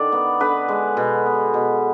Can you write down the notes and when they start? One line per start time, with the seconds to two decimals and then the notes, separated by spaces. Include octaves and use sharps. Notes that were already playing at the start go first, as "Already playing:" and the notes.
Already playing: D3 D#3 D5
0.12 B3
0.40 D3 B4
0.69 G#3
0.97 B2
1.26 B3
1.54 B2